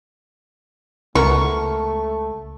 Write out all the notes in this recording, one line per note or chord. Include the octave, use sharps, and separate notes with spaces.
C#2 A3 B3 E4 A#4 C#6